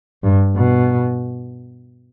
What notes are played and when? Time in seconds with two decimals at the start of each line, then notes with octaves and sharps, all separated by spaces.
0.23 G2
0.57 B2